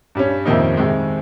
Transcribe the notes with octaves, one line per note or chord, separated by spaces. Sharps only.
G2 G3 C#4
F2 C3 D#3 A#3 D#4
C3 D#3 G#3